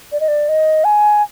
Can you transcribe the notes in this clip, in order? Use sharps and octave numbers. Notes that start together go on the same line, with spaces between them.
D5
D#5
D5
D#5
G#5